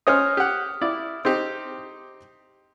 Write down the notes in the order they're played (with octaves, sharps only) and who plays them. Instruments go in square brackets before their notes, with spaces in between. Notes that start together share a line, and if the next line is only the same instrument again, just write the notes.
[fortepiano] C#4 C5 D#5 [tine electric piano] D#6 F6
[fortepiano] G4 F#5
E4 D5
C4 D#4 G4